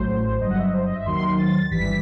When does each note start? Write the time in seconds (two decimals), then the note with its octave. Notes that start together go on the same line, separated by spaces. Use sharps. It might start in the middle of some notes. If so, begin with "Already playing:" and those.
Already playing: A1 A2 F#3 C5
0.41 G1 G2 F#3 D#5
0.50 F#5
0.58 E5
0.66 D#5
0.73 C5
0.85 D#5
0.95 E5
1.05 D#2 D#3 F#3 C6
1.38 A6
1.71 G1 G2 E3 G3 B6